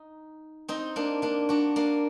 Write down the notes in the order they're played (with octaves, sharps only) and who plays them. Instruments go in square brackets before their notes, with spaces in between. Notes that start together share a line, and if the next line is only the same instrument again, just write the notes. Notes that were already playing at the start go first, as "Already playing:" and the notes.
Already playing: [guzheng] D#4
C4 D#4
A#3 D4
A#3 D4
D4 F#4
A#3 D4